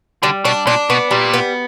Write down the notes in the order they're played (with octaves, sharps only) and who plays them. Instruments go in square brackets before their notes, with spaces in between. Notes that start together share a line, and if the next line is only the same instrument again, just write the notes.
[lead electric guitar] D3 [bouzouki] G3
[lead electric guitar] B2 [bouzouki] D4
[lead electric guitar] A#2 [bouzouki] D4
[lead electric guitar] B2 [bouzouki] B3
[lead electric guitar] A#2 [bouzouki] G3
[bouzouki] B3